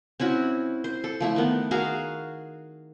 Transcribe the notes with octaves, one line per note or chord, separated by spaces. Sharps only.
C4 C#4 E4 F#4
C5
A4
F3 A3 E4
D#3 B3
F#4 G#4 A#4 F5